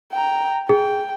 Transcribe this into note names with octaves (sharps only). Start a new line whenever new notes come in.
G5 A#5
G#4 G5